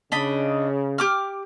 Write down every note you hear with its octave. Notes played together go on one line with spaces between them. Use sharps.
C#3 D4 D#5 B5
G4 D6 F6